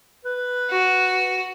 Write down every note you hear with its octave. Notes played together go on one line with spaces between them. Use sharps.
B4
F#4